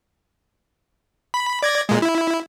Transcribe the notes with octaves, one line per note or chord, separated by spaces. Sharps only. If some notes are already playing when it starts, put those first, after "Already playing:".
B5
D5 G#6 A#6
A#2 G#3
E4